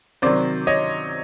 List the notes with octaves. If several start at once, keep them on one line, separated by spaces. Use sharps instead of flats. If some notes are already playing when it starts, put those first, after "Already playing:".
C3 D#3 F#3 C5 D5
C#5 D#5